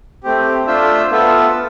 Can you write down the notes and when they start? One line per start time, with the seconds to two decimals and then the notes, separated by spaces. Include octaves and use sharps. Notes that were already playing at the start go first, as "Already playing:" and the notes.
0.23 A3 C4 G4
0.66 A3 D4 F4 C5 E5
1.11 B3 F4 A4 E5